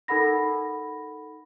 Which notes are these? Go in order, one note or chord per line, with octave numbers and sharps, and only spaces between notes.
D#4 A4 A#4 F#5 B5 A#6